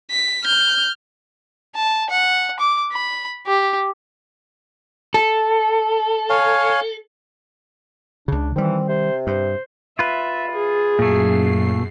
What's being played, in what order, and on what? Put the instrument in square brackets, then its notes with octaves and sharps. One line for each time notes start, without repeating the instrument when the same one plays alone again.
[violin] B6
F6 G6
[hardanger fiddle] A5
F#5
D6
B5
G4
[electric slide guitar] A4
[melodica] C#5 F5 G#5
[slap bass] C#2 C#3 [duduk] D4
[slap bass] D#3 G3 [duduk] E3 [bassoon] C4
[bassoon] C3 [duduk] C5
[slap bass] G2 [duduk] C5
[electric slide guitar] F4 B4 [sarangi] E5
[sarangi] G#4
[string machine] F#2 C7 [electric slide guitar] A#2 A3